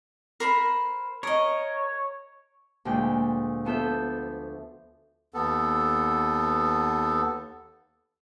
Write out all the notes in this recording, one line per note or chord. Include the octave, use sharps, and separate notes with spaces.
A#4 C5 B5
A#4 C#5 D#5
D2 A#2 G#3 G5
F3 B3 A4 E5 G6
D#2 B3 A4